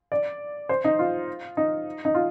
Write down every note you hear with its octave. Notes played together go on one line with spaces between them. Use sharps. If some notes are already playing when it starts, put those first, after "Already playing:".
D5
C5
D#4
F4
D#4
D#4
F4